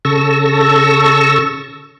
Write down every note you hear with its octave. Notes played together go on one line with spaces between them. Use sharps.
C#3 A4 A5 C#6 E6 A#6